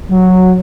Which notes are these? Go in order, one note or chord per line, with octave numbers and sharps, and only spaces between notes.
F#3